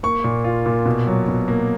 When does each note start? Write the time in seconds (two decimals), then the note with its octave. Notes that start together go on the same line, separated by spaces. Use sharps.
0.03 A#3 C#6
0.24 A#2
0.44 F4
0.66 A#2
0.86 B2
1.07 F#3
1.28 B2
1.48 A#3